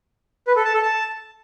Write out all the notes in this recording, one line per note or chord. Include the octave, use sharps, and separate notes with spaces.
B4
A4
A5
A4
A5